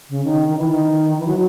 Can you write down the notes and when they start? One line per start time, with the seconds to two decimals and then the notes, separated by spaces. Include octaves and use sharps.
0.09 C#3
0.24 D#3
0.49 D#3
0.58 E3
0.68 D#3
1.19 E3
1.27 F#3